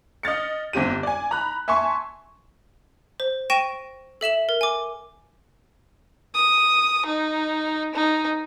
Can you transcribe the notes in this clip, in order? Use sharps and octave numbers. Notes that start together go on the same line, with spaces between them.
D#5 F6 A6 C#7
G1 C4 G4 D#7
D5 G#5
A#5 B5 F#6
E5 G#5 A5 C6 C#6
C5
G5 C#6 A#6 D#7 E7
A4 E5 E7 F#7
A#4
G#5 D6
D#6
D#4
D#4